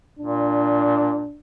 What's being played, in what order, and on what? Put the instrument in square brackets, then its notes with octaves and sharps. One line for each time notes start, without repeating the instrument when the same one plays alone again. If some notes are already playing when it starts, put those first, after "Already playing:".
[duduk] A#2 [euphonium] D4